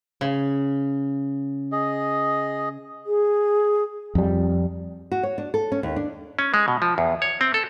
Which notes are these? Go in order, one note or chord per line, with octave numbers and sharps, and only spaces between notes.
C#3
G#4 D#5
G#4
F2 G3
F#4
C#5
D4
A4
C#4
D#2
D4
C#4
G#3
B2
F3
E2
C#5
C4
A4